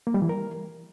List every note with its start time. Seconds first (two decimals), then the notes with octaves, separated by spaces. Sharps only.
0.07 A#3
0.14 G3
0.22 E3
0.29 A#4